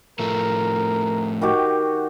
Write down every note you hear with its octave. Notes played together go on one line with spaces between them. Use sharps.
A2 F3 A3 A#4
D#3 F#4 G4